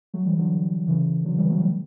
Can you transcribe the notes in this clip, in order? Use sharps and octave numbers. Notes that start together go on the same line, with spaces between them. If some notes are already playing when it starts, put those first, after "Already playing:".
F#3 A3
E3 G3
D3 F#3
C#3 E3
D3 F#3
E3 G3
F#3 A3
E3 G3